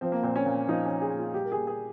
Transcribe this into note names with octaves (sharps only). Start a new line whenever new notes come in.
F3 C4
A#3
A#2 C4
C#4
A#2
F3 D#4
C#4
F3
G#4
A#2
F4
G3 G4
A#4
A#2 G#4
G#4